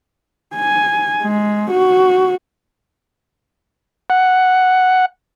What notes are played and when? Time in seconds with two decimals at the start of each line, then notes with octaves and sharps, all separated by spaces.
0.55 G#5
1.22 G#3
1.71 F#4
4.10 F#5